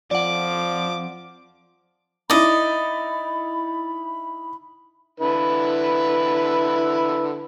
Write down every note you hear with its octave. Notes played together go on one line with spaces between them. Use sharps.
F2 F3 D5 F#5 D6
D#4 E4 D5 D#5 B5
D3 E4 B4